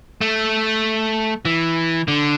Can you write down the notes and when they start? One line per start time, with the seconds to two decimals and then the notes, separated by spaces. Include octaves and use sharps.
0.21 A3
1.45 E3
2.08 D3